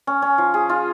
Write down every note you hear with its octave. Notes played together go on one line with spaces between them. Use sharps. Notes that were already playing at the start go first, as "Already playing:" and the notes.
C#4
C#4
F3
G#4
F4